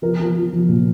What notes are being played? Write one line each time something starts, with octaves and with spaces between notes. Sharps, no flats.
F3 A#4
F3
F3
F3
A#2